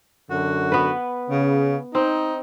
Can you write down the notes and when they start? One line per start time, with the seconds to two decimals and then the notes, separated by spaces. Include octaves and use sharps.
0.30 F#2 D3 F#4
0.72 B3 B4
1.30 C#3
1.95 C4 D#4